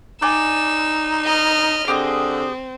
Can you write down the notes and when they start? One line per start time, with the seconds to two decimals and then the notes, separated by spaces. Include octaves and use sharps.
0.22 D#4 D5 G#5 E6
1.25 D#5 F6
1.88 D3 C4 G4 G#4 D#5